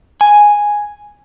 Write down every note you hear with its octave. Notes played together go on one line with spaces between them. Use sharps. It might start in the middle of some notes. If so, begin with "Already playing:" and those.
G#5